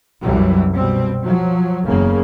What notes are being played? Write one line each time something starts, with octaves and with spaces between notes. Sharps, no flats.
C2 F#2 E3 F#3 G3
B2 G3 C4
F3 F#3
F#1 E2 C#3 A#3